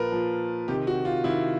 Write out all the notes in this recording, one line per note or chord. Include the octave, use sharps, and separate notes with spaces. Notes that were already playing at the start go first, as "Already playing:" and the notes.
Already playing: A#2 F3 A#4 B4
A#2 F3
C3 D#3 G4
F#4
F4
C3 D#3 E4